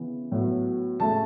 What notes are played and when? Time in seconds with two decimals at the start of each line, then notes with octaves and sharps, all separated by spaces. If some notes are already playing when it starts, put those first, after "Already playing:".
Already playing: C#3 E3 B3
0.32 A2 F#3 B3
1.00 C#3 A3 A5